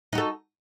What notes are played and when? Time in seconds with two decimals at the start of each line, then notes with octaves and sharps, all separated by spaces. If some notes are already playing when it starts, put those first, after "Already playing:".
0.13 D#4
0.15 F#4
0.18 A4